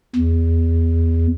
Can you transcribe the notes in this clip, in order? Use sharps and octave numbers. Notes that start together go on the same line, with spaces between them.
E2